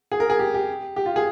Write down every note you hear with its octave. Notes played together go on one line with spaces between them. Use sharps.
G#4
A#4
G#4
G4
G4
G4
F4
G#4